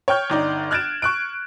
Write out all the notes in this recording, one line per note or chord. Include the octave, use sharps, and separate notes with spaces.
C#5 G5 C#6 F6 G6
G1 D#4 D5
F6 F#6 G#6 A6 D7 E7
C#6 F#6 D7